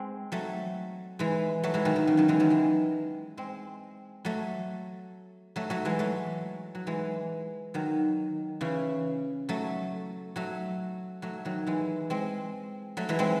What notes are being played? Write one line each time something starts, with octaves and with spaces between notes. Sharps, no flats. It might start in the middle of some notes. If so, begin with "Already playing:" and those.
Already playing: G#3 C4
F#3 A3
E3 G#3
F#3 A3
E3 G#3
D#3 F#3
D#3
C#3
D#3 F#3
E3 G#3
D#3 F#3
E3 G#3
G#3 C4
F#3 A3
F#3 A3
F#3 A3
E3 G#3
F#3 A3
F#3
E3 G#3
D#3 F#3
C#3 E3
F#3 A3
F#3 A3
F#3 A3
D#3 F#3
E3 G#3
G#3 C4
F#3 A3
E3 G#3
G#3 C4